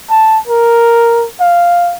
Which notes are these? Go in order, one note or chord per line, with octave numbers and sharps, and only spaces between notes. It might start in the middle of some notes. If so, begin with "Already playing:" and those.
A5
A#4
F5